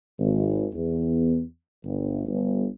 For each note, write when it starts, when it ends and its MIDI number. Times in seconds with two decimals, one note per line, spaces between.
0.19 0.65 32
0.73 1.41 40
1.84 2.22 31
2.26 2.65 31